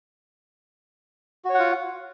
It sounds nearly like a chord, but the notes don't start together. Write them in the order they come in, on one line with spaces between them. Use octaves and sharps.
F#4 C#5 F#5 F4